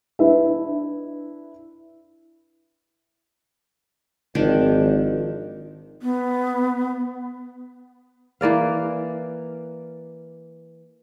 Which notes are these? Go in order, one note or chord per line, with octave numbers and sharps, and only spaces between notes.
D4 E4 B4 E5
G#1 D#3 F3 D4
B3
E3 A#3 D5 F5